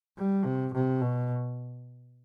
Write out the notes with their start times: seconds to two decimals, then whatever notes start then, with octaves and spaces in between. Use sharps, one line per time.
0.18 G3
0.45 C3
0.74 C3
1.01 B2